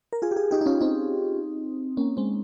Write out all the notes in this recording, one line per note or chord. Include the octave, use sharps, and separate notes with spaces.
A#4
F4 G#4
G4
F4 G#4
D#4 G4
D#4
C#4 F4
C4 D#4
A#3 C#4
G#3 C4